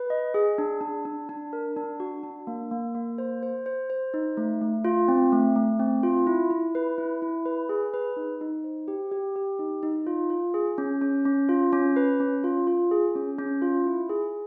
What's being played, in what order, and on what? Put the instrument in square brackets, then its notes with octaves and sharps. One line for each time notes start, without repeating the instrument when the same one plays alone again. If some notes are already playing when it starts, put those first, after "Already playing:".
Already playing: [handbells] B4
D#5
G#4
D4
D4
D4
D4
A#4
D4
F#4
D4
A#3
A#3
A#3
C5
C5
C5
C5
D#4
A3
A3
F4
C4
A3
A3
C4
F4
E4
E4
B4
E4
E4
B4
G#4
B4
D#4
D#4
C5
G4
G4
G4
D#4
D#4
F4
F4
G#4
C#4
C#4
C#4
F4
C#4
B4
C#4
F4
F4
G#4
C#4
C#4
F4
E4
G#4